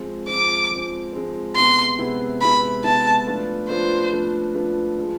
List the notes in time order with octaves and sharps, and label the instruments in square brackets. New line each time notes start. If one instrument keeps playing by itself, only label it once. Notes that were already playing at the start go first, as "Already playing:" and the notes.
Already playing: [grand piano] F3 G#3 C4
[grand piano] F3 G#3 C4 [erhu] D6
[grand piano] F3 G#3 C4
F3 G#3 C4
[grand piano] C3 G#3 B3 E4 B4 [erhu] C6
[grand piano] C3 G#3 B3 E4 B4
[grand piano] C3 G#3 B3 E4 B4 [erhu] B5
[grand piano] C3 G#3 B3 E4 B4 [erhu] A5
[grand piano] F3 A3 D4 F4 B4
[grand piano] F3 A3 D4 F4 B4 [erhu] C5
[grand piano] F3 A3 D4 F4 B4
F3 A3 D4 F4 B4
F3 G#3